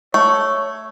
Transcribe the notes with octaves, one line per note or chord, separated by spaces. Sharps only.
A3 C#5 C#6